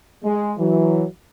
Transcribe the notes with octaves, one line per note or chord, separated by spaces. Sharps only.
G#3
E3 F#3